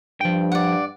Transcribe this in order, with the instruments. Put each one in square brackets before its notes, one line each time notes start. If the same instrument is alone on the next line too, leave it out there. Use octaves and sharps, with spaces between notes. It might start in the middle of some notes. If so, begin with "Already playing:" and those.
[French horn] G2 [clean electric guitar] F3 G5
[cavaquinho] D5 F#5